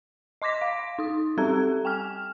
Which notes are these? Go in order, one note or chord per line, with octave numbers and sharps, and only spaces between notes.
D#5 C6 D6 A#6 B6
F5
D#4 D#6
G3 C4 G4 A4 A#5 G#6
G5 G#5 F6